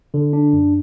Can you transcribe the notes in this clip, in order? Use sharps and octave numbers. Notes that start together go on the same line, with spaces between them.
D3
D4
F#2